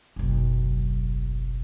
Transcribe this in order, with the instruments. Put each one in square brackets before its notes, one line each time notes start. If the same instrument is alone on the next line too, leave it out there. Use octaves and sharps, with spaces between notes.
[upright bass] F#1 B1